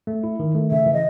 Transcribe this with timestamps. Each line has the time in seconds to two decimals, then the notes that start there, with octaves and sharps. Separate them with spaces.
0.07 A3
0.24 E4
0.40 D#3
0.55 A3
0.71 C#3 E5
0.86 E3
0.93 D#5